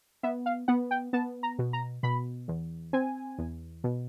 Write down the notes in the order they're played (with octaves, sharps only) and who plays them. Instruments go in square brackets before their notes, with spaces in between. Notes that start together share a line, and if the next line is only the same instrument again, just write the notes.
[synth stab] B3 E5
F5
B3 F#5
G5
B3 A5
A#5
B2
A#5
B2 B5
E2
C4 G#5
E2
B2